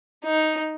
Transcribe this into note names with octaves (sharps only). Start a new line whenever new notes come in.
D#4